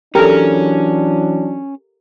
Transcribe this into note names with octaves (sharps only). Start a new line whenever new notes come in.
E3 F#3 C#4 D4 G4 A4 A#4